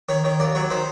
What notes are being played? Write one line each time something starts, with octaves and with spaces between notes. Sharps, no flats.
D#3 C#5
D#3 C#5
D#2 D5
F#3 C#5
D#3 C5